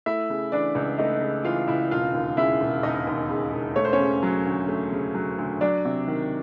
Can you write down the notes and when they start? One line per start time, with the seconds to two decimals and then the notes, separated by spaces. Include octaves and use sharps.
0.06 A3 E4 E5
0.30 C#3
0.52 E3 D4 D5
0.75 C#2
0.98 A3 D#4 D#5
1.21 C#3
1.44 E3 F4 F5
1.68 C#2 E4 E5
1.91 E1 F4 F5
2.14 D#2
2.37 C#3 E4 E5
2.61 E1
2.83 E1 D#4 D#5
3.07 D#2
3.30 C#3
3.53 E1
3.76 A3 C#5
3.85 C5
3.93 C#4 C#5
4.00 C#3
4.23 F#3
4.46 D2
4.68 A3
4.92 C#3
5.15 F#3
5.39 D2
5.61 F#3 D4 D5
5.85 C3
6.08 D#3